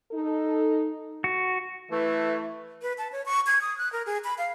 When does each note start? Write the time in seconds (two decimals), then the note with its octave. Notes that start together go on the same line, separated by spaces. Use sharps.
0.12 D#4 A4
1.24 F#4
1.91 E3 A3
2.82 B4
2.98 A5
3.12 C#5
3.26 C#6
3.47 G#6
3.61 D#6
3.78 F#6
3.92 A#4
4.06 G#4
4.24 B5
4.38 F5